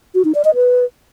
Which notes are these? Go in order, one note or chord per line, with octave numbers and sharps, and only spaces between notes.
F#4
D#4
D5
D#5
B4